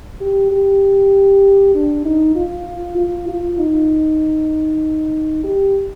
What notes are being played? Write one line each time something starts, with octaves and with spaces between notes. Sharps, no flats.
G4
G4
D4
D#4
F4
F4
F4
D#4
G4